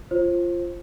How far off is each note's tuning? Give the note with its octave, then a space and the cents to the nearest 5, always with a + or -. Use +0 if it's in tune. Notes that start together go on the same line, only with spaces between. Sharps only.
F4 -15 C5 +25